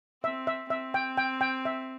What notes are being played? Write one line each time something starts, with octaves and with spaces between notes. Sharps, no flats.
C4 E5
E5
C4 E5
G5
G5
G5
E5